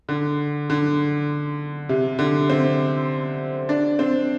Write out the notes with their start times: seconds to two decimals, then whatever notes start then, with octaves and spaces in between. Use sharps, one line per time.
0.09 D3
0.70 D3
1.89 C3
2.19 D3
2.50 C4
3.69 D4
3.99 C4